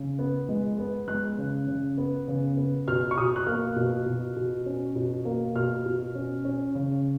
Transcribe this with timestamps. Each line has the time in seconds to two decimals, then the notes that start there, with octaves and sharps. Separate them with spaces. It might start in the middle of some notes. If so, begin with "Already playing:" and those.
Already playing: C#3
0.19 B3
0.49 G#3
0.78 B3
1.08 G#3 F#6
1.38 C#3
1.68 C#3
1.98 B3
2.28 C#3
2.57 B3
2.88 B2 F6
3.11 C#6
3.17 B2 D#6
3.36 F#6
3.47 A#3 F6
3.76 B2
4.06 B2
4.36 B2
4.66 C#4
4.96 B2
5.25 A#3
5.56 B2 F6
5.86 B2
6.15 C#4
6.45 C#4
6.75 C#3